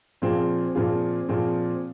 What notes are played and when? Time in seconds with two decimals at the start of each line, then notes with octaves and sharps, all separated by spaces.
0.22 A#2 F3 C4 F4 G#4
0.75 A#2 F3 C4 F4 G#4
1.29 A#2 F3 C4 F4 G#4